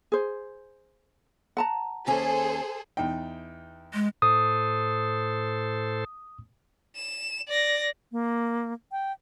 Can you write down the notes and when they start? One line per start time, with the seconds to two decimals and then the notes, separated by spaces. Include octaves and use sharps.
0.12 G#4 C5
1.57 F#5 A5 A#5
2.07 D#2 C#4 G#4 A4 C5 G#5
2.97 E2 D#4 G5
3.94 G#3
4.22 A2 A4 C5 D#6
6.95 E7
7.48 D5 A#6
8.12 A#3
8.92 G5